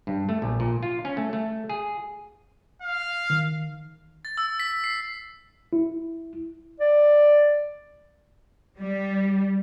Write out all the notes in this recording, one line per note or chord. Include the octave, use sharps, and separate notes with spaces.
G2
A3
A#1
A#2
F4
C#4
A3
A3
G#4
F5
D#3
A6
E6
B6
C7
E4
D5
G3